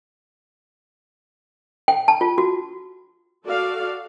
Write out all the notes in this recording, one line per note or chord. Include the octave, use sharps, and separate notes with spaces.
G5
A5
F4
F#4
F#4 A4 D5 F5